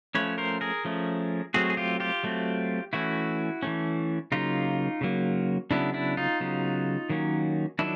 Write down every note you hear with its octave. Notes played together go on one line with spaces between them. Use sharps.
F3 A3 C#4 B4 C#5
A#4 C5
G#4 A#4
F3 A3 C#4
F#3 A3 C4 F#4 G#4
G#4
F4 G4
F4 G4
F#3 A3 C4
E3 A3 C#4 E4 F#4
E3 A3 C#4
C#3 F#3 A#3 D#4 F4
C#3 F#3 A#3
C#3 F#3 B3 D4 E4
D4 E4
D#4 F4
C#3 F#3 B3
D#3 F#3 A#3 C#4
D#3 F#3 D4 E4